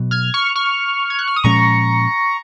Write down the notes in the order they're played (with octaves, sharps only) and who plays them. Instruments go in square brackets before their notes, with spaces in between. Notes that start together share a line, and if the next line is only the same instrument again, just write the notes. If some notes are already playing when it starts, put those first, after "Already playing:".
Already playing: [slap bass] B2 F#3 B3
[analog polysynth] F6 G#6
C#6 F6
C#6 F6
G#6
F#6
F6
D#6
[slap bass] A#2 F3 G#3 C#4 [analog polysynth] A#5 C#6